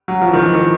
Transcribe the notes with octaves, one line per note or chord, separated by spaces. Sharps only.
F#3
F3
E3
D#3
E3
D#3